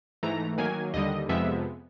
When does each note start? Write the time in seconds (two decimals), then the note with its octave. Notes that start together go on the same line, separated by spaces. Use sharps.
0.23 G#2 E3 A3 A#5
0.58 D#3 F#3 A#3 G#5
0.94 D#2 D3 G3 D#5
1.29 F2 C3 F3 G#3 B3 E5